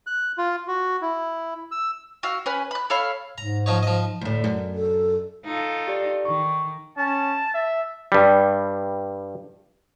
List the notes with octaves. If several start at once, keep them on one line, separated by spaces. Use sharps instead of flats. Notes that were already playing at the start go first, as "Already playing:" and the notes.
F#6
F4
F#4
E4
E6
F#4 F5 E6
C#4 B4 G#5
B5 F#6
A4 C#5 F5 B5
G#2 A#5
F3 D#4 C#5
F3 D#5
D2 A2
F#2
A4
D#4 F4 A4
G4 D5
D#3 C#6
C#4 A5
E5
G2 G3